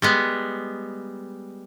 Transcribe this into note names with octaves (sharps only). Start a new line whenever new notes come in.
G3 G#3 B3